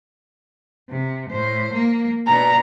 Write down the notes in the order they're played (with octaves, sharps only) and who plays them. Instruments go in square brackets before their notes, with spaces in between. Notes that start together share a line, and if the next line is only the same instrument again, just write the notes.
[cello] C3
A2 C5
A#3
[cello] B2 D4 [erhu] A#5